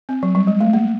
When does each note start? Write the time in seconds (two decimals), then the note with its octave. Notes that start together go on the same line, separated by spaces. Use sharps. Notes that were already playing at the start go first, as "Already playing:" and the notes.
0.09 C4
0.23 F#3
0.35 G3
0.47 G#3
0.61 A3
0.73 A#3